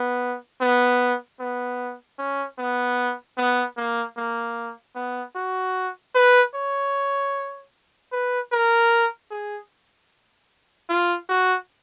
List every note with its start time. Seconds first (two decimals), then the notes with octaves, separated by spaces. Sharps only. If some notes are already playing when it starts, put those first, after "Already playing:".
Already playing: B3
0.61 B3
1.40 B3
2.19 C#4
2.58 B3
3.38 B3
3.77 A#3
4.17 A#3
4.95 B3
5.35 F#4
6.15 B4
6.54 C#5
8.12 B4
8.52 A#4
9.31 G#4
10.89 F4
11.29 F#4